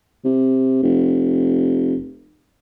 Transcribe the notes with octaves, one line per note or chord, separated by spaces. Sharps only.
C3
F1